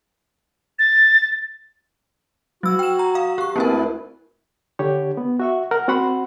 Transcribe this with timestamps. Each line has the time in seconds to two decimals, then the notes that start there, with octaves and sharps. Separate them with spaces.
0.79 A6
2.63 F#3 F#4 E6
2.79 G5 E7
2.99 A#5
3.15 F5
3.38 G4 C#6
3.56 D2 A#3 C4 E4 A#4 B4
4.79 D3 G4 C#5
5.17 B3
5.40 F#4 E5 C#6
5.71 A#4 F#5 F6
5.88 C4 F#4 F#5 B5 C6